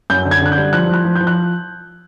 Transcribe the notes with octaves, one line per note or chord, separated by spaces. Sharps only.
F#2 G6
D3
G#6
D3 F#6
G6
G3
F3 F#6
F3 F#6
F3
G6
F3
F#6